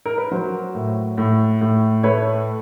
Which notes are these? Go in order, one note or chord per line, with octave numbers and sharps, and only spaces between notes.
A#4
B4
F#3 A#4 C5
A2
A2
A2
A3 B4 C#5